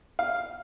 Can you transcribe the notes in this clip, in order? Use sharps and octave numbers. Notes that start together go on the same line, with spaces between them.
F5